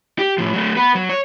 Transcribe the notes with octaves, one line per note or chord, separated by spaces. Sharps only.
G4
A2 F3
F#3 A3
B3 B4
F#3
C#5